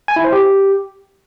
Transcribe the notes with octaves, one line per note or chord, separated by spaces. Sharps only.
G#5
E4
C5
G4